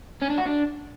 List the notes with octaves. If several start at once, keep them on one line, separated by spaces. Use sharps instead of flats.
C#4
D4
F#4
D4